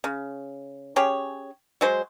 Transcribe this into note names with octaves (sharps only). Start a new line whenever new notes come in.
C#3
C#4 G4 G#4 C#5
F#3 G#3 C5